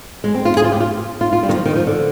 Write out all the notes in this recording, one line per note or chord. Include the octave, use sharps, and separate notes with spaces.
G#3
C4
F4
G#4
F4
G4
F4
F4
F4
G3
D#3
F3
D#3
F3
D3